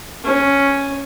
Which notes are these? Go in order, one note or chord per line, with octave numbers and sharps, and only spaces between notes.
C#4